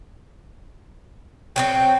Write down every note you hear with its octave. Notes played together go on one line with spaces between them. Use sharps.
F#3 B3 C4 G5